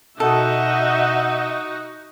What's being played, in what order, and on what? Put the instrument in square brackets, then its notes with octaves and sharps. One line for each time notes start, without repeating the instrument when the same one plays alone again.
[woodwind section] B2 F#5 [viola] D#4 F#4 [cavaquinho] A4 [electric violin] D#5 E5